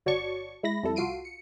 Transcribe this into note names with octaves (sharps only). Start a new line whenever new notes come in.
G1 F#4 C#5 D5 A5 C#6
G#3 E4 B5 A#6
F2 G3 E4 A4
C2 F4 F#4 C7 D7 D#7
C#7